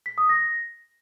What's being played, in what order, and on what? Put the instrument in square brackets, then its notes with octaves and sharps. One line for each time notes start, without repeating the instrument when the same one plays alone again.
[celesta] B6
D#6
A#6